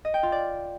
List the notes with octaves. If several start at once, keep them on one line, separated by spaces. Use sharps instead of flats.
D#5
G5
F4
D5